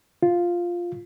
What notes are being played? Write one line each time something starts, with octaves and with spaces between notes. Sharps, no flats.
F4